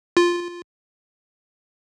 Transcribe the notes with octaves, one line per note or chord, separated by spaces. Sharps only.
F4